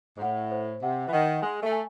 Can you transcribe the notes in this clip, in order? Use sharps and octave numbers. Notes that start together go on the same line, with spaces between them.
G#2
A2 F#5
C5
C3 F#5
E3
D#3 F#5
G#3 G#5
A3
G#5